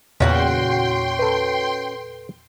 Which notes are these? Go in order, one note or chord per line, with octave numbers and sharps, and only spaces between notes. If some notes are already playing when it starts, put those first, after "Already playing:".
E2 A#2 C#3 C#4 F#4 F#5 G5 C6
A4 B4